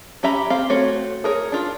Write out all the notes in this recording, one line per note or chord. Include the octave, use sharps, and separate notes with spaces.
C#4 G4 E5 A#5 B5
C4 G4 F5
A3 C4 F#4 C#5
G#4 A#4 C#5
D4 F4